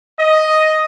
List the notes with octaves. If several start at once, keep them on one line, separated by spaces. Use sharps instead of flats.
D#5